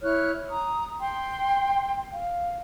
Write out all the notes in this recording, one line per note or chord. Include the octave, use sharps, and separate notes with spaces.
E4 C#5 F6 F#6
A#5 D#6
G5 C6
F5